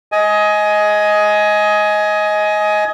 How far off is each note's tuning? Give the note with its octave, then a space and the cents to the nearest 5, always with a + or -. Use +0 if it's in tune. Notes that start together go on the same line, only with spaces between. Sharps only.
D#5 +15 G#5 +15